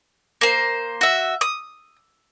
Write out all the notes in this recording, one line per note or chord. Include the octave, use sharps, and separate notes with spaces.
A#3 C5
F#4 E5
D#6